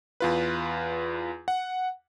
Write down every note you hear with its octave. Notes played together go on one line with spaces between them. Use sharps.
E2 F4 B4
F#5